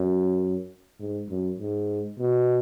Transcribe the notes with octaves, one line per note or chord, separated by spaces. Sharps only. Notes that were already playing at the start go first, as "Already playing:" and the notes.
Already playing: F#2
G#2
F#2
G#2
B2